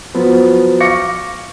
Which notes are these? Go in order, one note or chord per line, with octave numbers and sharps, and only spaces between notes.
F3 F#3 B3
F5 C#6 D6 A#6 C#7